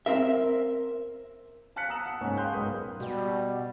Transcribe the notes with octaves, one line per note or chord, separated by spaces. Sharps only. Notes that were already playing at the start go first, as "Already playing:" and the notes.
C4 A#4 E5
F5 A5 F6 F#6 B6 C#7
A5 A#5 D#6 E6 E7 F#7
F#5
C#2 G#2 A#3 C#4 C#5 G#5
F5 G5 C6 D#6 F#6 G6
B1 G#2 A#4 B4 D#6
B2 G3 F#4